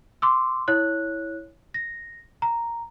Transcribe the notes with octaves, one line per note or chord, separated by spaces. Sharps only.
C6 D6 E6
E4 C#5 F#6
A#6
A#5